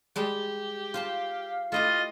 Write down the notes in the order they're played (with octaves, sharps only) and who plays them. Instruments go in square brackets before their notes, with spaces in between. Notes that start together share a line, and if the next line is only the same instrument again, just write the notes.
[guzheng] G3 G#3 A5 [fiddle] G4
[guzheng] F4 C5 A5 [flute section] F5
[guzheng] A3 E4 G4 [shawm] F4 [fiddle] D#5